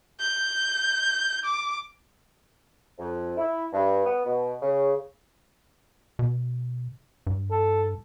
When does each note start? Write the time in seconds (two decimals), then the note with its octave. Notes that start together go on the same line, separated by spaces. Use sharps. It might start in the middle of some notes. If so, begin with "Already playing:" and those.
0.20 G6
1.45 D6
2.99 F2
3.37 E4
3.73 G2
4.06 B3
4.25 B2
4.62 C#3
6.19 B2
7.27 G2
7.51 A4